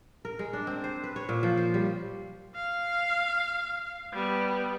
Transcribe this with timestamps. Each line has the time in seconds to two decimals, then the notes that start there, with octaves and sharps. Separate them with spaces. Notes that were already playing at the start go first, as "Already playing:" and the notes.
0.25 A#4
0.39 G#3
0.53 D4
0.67 C4
0.84 C5
1.04 B4
1.16 C#5
1.29 A#2
1.43 F3
1.57 C5
1.74 G3
2.55 F5
4.13 G3 B3